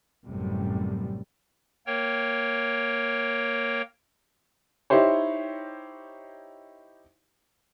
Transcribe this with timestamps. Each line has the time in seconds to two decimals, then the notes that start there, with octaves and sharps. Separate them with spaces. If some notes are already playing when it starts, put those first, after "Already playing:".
0.25 A1 F#2 A2 C3 G3
1.87 A#3 A#4 C#5 G5
4.90 D#4 E4 G4 C5 C#5